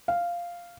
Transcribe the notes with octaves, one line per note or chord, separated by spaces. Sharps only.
F5